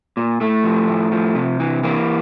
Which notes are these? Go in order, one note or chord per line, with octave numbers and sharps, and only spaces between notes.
A#2
A2 A3
F3
A2
F3
C3
E3
E3 A#3